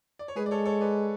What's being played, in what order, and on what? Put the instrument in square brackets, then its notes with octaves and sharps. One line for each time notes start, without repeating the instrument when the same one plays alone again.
[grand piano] D5
C#5
[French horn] G#3 [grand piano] G#4 B4
[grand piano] D5
A4 C#5
A4 C#5
B4 D5